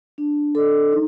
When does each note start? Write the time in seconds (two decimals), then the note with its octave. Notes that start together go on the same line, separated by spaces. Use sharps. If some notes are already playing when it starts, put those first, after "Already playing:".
0.18 D4
0.55 A4 D#5
0.92 D#4